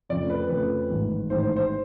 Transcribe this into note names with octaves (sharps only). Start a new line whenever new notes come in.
F2 C#3 F3 A3 D5
B4
F2 C#3 F3 A3 B4
A1 G#2 D#3
A1 G#2 D#3 C5
C5
C5